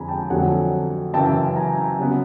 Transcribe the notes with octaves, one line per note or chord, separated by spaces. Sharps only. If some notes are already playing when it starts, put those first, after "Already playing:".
Already playing: F2 D3 F3 G#3 G#5 A#5 B5
G5 A5
F2 D3 F#3 A3 F#5 G#5
F#2 C#3 E3 G5 A5
G#5 A#5
C#3 F#3 B3